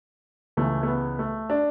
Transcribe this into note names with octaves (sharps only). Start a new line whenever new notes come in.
C#2 C#3 E3 A3
A3
B3
A3
D4